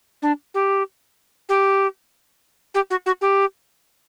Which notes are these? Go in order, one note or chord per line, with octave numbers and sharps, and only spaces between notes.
D4
G4
G4
G4
F#4
F#4
G4